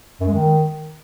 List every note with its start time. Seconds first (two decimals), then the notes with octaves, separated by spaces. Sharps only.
0.21 F#2
0.28 G#3
0.35 D#3